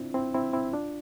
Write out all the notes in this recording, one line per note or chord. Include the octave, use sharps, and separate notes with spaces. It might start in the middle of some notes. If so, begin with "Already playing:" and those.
Already playing: C4 D4 E4 F4
C4 E4
C4 E4
C4 E4
D4 F4